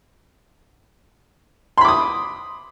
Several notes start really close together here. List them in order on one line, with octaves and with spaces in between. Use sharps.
C6 B5 D6 D#6